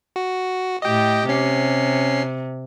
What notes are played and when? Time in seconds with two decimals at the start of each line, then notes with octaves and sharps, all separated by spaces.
0.16 F#4
0.82 A2 G4 D#5 G5
1.29 C3 C#4 C7